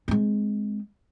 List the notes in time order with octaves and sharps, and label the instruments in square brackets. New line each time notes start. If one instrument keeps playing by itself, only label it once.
[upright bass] G#3 C4